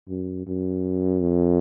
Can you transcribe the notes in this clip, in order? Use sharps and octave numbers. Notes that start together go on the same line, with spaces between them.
F#2
F#2
F2